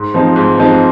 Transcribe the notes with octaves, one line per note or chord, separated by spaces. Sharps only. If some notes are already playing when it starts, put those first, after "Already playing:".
Already playing: G#2
F3 C4 D#4
G#2
F3 C4 D#4